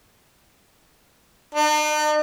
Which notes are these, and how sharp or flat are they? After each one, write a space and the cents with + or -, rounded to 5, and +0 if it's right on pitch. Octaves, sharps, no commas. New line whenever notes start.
D#4 -45